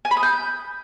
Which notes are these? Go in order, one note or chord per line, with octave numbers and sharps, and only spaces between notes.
G#5
B5
D#6
G6